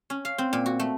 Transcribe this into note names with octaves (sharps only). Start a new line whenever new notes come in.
C#4
F5
C4
A#2
F#4
A3